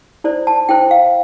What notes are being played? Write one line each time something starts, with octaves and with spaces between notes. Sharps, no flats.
E4 A4 C5 D5
A5
E4 A4 C5 G5
F5